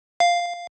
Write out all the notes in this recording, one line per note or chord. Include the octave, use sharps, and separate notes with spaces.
F5